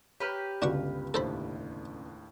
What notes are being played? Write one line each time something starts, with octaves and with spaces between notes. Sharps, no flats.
G4 B4 C#5 A#5 F6
G1 C#2 D4 F#4 F5 C#6
D#2 A2 D4 A4 C5 B5